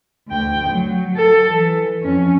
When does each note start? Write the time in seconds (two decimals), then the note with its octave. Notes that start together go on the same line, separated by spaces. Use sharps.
0.29 D2 G5
0.68 F#3
1.16 A4
1.48 E3
2.03 F2 C#4